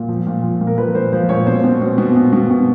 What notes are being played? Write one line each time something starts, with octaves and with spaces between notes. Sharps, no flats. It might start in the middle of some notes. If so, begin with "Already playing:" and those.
Already playing: A#2
F3
A#2
F3
A#2
A#4
F3 B4
A#2 C5
F3 C5
A#2 C#5
B2 C5
B2
B2
B2
B2
B2
B2